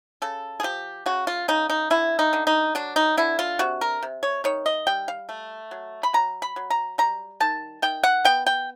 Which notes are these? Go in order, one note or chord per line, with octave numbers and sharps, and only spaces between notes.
C#3 A4
G#4
F3 G4
C#3 F#4
F4
C#3 D#4
D#4
D3 E4
D#4
D3
D#4
F#3 D4
D#4
D3 E4
F4
C3 F#4
A#4
C3
C#5
D#3 C#5
D#5
G3 G5
F5
A3
F#3
B5
F#3 A#5
B5
F#3
A#5
G3 A#5
D#3 A5
D#3 G5
F#5
B3 G5
G5